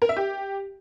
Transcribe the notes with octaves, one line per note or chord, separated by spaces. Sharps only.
A#4
E5
G4